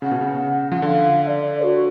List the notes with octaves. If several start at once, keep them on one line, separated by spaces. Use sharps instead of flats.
C#3 F#5
B2
C#3
F3 F#5
D3 F5 F#5
F5
D5
F#4